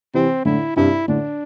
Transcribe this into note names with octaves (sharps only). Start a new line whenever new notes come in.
C3 E3 C4
A2 D3 E4
G2 C3 E4
A2 D3 D4